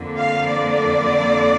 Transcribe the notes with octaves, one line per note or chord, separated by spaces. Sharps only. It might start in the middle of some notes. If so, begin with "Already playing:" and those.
Already playing: F2 D3 A#3
F5
D5